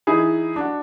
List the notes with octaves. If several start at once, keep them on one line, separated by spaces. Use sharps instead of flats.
E3 D#4 E4 G#4
D4 F#4